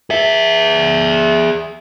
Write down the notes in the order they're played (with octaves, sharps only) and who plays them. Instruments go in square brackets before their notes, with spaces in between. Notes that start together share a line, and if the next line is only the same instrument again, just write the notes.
[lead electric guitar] G#4 E5